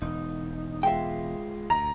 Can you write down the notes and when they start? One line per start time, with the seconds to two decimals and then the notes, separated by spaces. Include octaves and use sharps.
0.02 E1 D#4
0.83 G#3 F4 E5 G5
1.70 D2 A#5